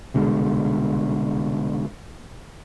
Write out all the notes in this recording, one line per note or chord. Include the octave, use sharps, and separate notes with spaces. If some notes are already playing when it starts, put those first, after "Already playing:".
C2 B2 D3 G#3